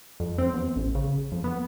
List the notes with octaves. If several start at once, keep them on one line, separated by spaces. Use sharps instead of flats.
F2
C4
E2
A1
C#3
F2
B3